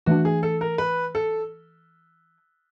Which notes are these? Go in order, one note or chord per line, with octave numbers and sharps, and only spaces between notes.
E3 A3 D4 F#4
G#4
A4
A#4
B4
A4